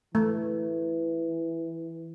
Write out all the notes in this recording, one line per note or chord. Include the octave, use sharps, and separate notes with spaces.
E3 A3